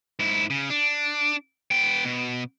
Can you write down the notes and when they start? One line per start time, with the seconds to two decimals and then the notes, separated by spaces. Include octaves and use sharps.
0.19 G#2 E4
0.50 C#3
0.70 D4
1.71 B3 G5
2.05 B2